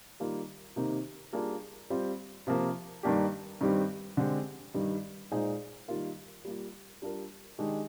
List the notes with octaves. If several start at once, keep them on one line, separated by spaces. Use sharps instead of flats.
D#3 G3 A#3 F4
C3 D#3 A#3 D#4 G4
G3 A#3 D4 F4 G#4
G3 C4 F4
C3 F3 A#3 F4
G2 D#3 A#3 D4 G4
G2 D#3 G3 C4 G4
D3 G#3 C4 G4
G2 D#3 G3
A#2 G#3 D#4 G#4 C5
D#3 G3 A#3 F4 A#4
G3 A#3 F4
G3 D4 F4 A#4
D#3 G#3 D4 G4